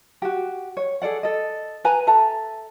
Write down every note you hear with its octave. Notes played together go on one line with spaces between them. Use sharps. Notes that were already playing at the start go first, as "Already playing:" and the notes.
F#4 G4
C#5
G#4 A4 D5 F#5
A4 D#5
B4 G#5 A#5
A4 E5 A5 A#5